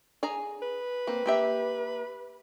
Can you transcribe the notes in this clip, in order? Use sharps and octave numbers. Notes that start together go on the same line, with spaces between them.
G#4 G#5 A#5
B4
A#3 C4
A#3 G4 E5